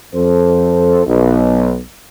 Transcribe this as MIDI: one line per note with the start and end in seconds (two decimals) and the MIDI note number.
0.14 1.01 41
0.14 1.01 69
0.14 1.01 72
1.06 1.78 35